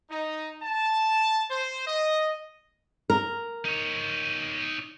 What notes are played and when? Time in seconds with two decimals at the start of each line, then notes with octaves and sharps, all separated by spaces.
0.10 D#4
0.63 A5
1.50 C5
1.87 D#5
3.10 A#4
3.65 D#4 C#5